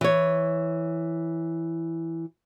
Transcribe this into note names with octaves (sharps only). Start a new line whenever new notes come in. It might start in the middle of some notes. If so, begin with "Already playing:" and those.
E3 C#5